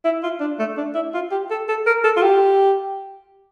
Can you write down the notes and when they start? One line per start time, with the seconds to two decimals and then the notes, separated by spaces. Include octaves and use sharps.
0.04 E4
0.23 F4
0.40 D4
0.59 A3
0.77 D4
0.95 E4
1.14 F4
1.31 G4
1.51 A4
1.69 A4
1.86 A#4
2.04 A4
2.17 F4
2.22 G4